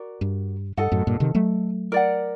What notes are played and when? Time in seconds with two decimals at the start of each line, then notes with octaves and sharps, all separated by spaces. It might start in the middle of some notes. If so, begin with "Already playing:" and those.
Already playing: F#4 A#4 D5
0.21 G2
0.77 G2 A4 D#5 F#5
0.92 F#2 A2
1.07 G2 A#2
1.20 C3 D#3
1.35 F#3 A3
1.92 A#4 D5 F#5